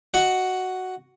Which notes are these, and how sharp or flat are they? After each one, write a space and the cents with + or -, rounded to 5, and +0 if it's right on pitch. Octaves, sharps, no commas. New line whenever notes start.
F#4 +5 D#5 +0 F#5 +5